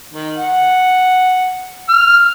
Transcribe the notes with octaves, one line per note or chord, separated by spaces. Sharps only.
D#3
F#5
F6